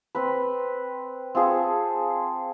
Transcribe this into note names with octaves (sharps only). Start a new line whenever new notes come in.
C4 B4
C4 F4 G#4 A4